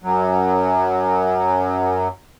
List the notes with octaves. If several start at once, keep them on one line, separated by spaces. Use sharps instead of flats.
F#2 F#3